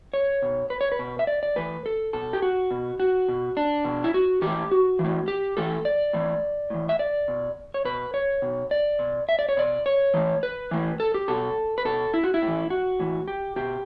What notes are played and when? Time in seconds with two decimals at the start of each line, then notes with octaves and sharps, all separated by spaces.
0.14 C#5
0.42 B2
0.70 B4
0.81 C#5
0.92 B4
0.99 B2
1.19 E5
1.27 D5
1.43 D5
1.56 A2 E3 B4
1.86 A4
2.13 B2 A4
2.33 G4
2.42 F#4
2.71 B2
3.00 F#4
3.28 B2
3.57 D4
3.84 B2
4.04 E4
4.14 F#4
4.42 A2 E3 G4
4.71 F#4
4.99 A2 E3
5.28 G4
5.57 A2 E3 A4
5.85 D5
6.13 A2 E3
6.70 A2 E3
6.89 E5
6.99 D5
7.28 B2
7.74 C#5
7.85 B2 B4
8.14 C#5
8.42 B2
8.71 D5
8.99 B2
9.29 E5
9.39 D5
9.49 C#5
9.57 B2 D5
9.86 C#5
10.14 A2 E3
10.43 B4
10.71 A2 E3
11.00 A4
11.14 G4
11.28 B2 A4
11.78 B4
11.85 B2 A4
12.14 E4
12.24 F#4
12.34 E4
12.42 A2
12.47 E3
12.70 F#4
12.99 A2 E3
13.28 G4
13.56 B2 G4